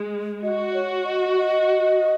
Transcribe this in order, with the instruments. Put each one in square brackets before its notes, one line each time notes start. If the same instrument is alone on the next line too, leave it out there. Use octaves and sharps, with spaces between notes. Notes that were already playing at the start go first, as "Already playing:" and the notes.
Already playing: [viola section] G#3
[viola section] F#4 [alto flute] D#5
[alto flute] C#5
D#5
D#5